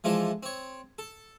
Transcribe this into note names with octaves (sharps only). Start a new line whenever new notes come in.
E3 F3 G#3 D4 A4
C4 C#5
A4